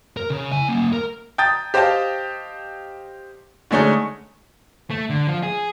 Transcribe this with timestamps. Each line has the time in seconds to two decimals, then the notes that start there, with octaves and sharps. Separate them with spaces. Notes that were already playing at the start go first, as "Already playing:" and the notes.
0.17 A#4
0.30 C#3
0.52 E4 G#5
0.69 A#3 C#4
0.93 A#4
1.38 G5 A5 A#5 D#6 G6 A6
1.74 G4 C5 D#5 F5 G5 A5
3.71 D3 G#3 A3 C#4 D#4
4.91 A3
5.10 D3
5.27 F3
5.43 G#4